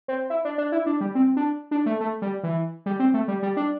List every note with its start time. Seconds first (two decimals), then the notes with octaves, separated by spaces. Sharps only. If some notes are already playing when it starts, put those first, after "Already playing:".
0.08 C4
0.30 E4
0.45 D4
0.58 D4
0.72 E4
0.86 D4
1.01 G3
1.15 C4
1.37 D4
1.71 D4
1.86 A3
2.01 A3
2.22 G3
2.43 E3
2.86 G3
2.99 C4
3.14 A3
3.28 G3
3.43 G3
3.57 D4